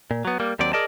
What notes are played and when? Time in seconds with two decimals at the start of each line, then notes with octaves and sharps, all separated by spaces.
0.11 A#2
0.25 F#3 B3
0.40 G3 A#3
0.59 D#2 F#3 C4 D5
0.73 G#4 A#4 D5 D#5 A5